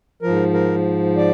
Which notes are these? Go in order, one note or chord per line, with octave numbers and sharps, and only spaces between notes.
G#2 F3 A#4
A#4
D5